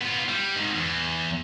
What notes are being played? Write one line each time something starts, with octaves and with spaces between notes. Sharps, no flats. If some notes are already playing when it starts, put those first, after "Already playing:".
B3 F4
G3
G#2 D#3
E2